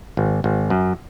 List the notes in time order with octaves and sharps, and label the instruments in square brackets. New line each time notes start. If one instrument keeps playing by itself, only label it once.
[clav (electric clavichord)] G#1
G#1
F#2